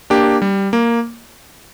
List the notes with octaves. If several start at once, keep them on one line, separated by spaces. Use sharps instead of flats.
A#3 D4 G4
G3
A#3